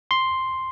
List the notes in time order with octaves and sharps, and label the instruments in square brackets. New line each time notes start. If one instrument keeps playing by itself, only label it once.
[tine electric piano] C6